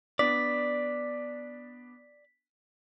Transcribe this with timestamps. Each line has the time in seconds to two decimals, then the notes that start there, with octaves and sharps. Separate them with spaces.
0.19 B3 D4 D5 B6